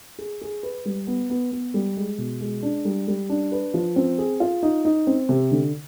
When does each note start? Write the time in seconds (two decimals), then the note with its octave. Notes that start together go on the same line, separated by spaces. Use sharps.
0.19 G#4
0.42 G#4
0.63 B4
0.85 G3
1.07 B3
1.30 B3
1.52 B3
1.74 G3
1.96 G#3
2.18 B2
2.41 G#3
2.63 D4
2.85 G3
3.08 G3
3.29 D4
3.52 B4
3.74 F3
3.96 C4
4.18 G#4
4.40 F4
4.63 D#4
4.85 D#4
5.07 C4
5.29 C3
5.51 D3